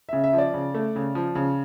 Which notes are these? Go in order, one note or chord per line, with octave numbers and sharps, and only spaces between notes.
C#3 E5
E5
F3
D5
C#3
A3
C#3
F3
C#3